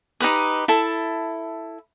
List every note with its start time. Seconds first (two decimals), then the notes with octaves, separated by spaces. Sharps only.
0.20 D#4 G4 B4 D#6
0.68 E4 A4 A5